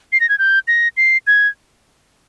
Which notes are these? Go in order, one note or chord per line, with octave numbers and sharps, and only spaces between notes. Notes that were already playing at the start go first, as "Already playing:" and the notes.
C7
A#6
G#6
G6
A#6
C7
G#6